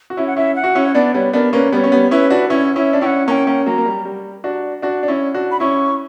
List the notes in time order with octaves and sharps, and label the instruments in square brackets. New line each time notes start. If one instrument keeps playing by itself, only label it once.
[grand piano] F#4
[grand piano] C#4 E4 [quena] E5
[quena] F#5
[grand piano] C#4 E4 [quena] E5
[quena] F#5
[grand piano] F#4
C#4 E4
[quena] C#5
[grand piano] B3 D4 [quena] D5
[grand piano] G3 B3 [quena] C#5
[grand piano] B3 D4 [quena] A#4
[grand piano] A#3 C#4 [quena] B4
[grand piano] G3 B3 [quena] C#5 D5
[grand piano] C#4
G3 B3
[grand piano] C#4 E4 [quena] B4
[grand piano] D4 F#4
[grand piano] C#4 E4 [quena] C#5
[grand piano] C#4 E4 [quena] E5
[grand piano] D4
[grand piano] C#4 E4 [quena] F#5 G5
[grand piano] A#3 C#4 [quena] G5 A#5
[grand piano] A#3 C#4
[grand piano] F#3 A#3 [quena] A#5
[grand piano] A#3
G3
G3
D4 F#4
D4 F#4
D4
C#4 E4
D4 F#4
[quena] B5
[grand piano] C#4 E4 [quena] C#6